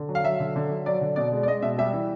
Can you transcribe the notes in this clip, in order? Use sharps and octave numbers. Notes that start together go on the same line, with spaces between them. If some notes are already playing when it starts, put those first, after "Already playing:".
Already playing: D3
F#3
F5
F#3 E5
D3
D3
F#3
F#3 D5
D3
B2 D5
G#3
D5
G#3 D#5
B2 E5
G3 E5
E3